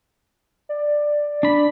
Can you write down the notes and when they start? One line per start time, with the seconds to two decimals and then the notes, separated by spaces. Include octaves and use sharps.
0.69 D5
1.43 D4 B5